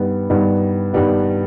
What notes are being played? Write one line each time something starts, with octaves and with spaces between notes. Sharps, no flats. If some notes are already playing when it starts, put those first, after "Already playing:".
Already playing: G2 D#3 G3 B3
G2 D#3 G3 B3
G2 D#3 G3 B3